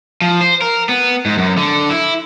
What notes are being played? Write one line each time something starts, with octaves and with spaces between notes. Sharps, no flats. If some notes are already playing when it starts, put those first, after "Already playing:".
F3
C5
A#4
B3
G#2
F#2
D3
E4